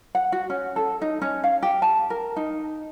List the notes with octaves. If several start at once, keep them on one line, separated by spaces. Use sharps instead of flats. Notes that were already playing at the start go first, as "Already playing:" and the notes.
F#5
F#4
C#4
A4
D#4
C#4
F5
G4
A5
A#4
D#4